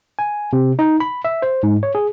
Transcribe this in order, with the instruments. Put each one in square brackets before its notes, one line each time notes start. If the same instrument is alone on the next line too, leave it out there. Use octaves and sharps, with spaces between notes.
[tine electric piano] G#5
C3
D#4
B5
E5
C5
G#2
C#5
G#4